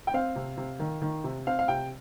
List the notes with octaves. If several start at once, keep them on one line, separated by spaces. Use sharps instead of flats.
G5
C4 F5
C3
C3
D#3
D#3
C3
C4 F5
F5
C3 G5